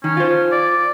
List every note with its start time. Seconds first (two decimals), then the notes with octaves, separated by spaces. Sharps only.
0.04 D#3 C#4
0.17 F4 C5
0.52 D5